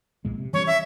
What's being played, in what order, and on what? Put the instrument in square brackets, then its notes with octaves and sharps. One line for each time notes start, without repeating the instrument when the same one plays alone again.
[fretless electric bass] A#1 A#2 G#3
C3
[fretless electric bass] E3 G3 C#4 [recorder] C#5
[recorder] E5